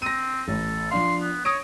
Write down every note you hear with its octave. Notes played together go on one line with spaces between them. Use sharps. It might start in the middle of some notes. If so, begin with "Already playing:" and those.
C4 A#6 D#7
A1 A4
F3 D4 F5 C6
B3
C#5 D#6 A#6 D7